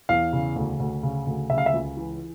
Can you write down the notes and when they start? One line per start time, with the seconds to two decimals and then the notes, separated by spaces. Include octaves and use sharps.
0.09 E2 F5
0.33 C#3
0.56 D2
0.80 D2
1.03 C#3
1.27 D2
1.50 C#3 E5
1.58 F5
1.66 E5
1.73 C#2
1.97 E3